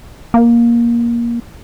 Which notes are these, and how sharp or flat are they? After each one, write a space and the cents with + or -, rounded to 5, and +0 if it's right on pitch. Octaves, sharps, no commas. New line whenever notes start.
A#3 +15